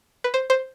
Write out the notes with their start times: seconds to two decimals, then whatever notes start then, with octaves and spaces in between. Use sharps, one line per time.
0.24 B4
0.34 C5
0.50 C5